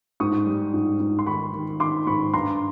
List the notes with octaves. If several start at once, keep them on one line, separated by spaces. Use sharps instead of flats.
G#2 C#6 D#6
G3
G#2
G#2
C6
D#3 B5 C#6
D#3
D#3 C6 D6
G#2 B5 C#6
G2 A#5 C6